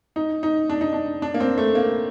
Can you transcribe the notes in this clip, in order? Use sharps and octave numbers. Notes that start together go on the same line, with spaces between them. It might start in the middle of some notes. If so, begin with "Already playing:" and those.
D#4
D#4
D4
D#4
D4
D4
A#3
C4
A3
A#3